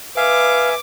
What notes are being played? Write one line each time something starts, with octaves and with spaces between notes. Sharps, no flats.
B4 E5 F5 G#5 D6